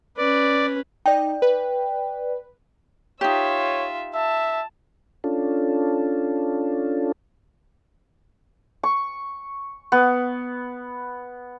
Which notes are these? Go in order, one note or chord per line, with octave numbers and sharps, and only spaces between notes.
C#4 B4 D5
D#4 D5 G5
B4
D#4 F4 G4 C#5 E5
E5 A5
C#4 D4 F4 A4
C#6
B3